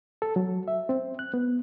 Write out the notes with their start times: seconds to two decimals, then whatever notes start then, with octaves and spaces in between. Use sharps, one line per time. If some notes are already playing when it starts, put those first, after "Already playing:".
0.22 A4
0.36 F#3
0.68 E5
0.89 C4
1.19 F#6
1.34 B3